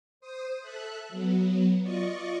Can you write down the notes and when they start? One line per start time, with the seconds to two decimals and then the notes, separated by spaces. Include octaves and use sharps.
0.20 C5 D#6
0.61 A4 E5 F#6
1.09 F#3 B3
1.83 F4 D5 D#5 C#6